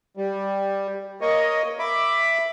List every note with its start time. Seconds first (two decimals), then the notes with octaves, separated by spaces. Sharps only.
0.17 G3
1.21 A#3 C#5 D#5
1.79 E5 B5 D6